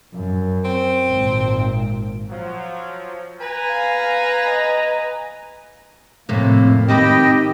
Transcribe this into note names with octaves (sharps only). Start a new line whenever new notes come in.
F#2
C4
G#1 A#2
F3 F#3
B4 G#5 A#5
F5
D#5
F2 A2 C3 A#3
D#3 C4 G4 B4 D#5 G5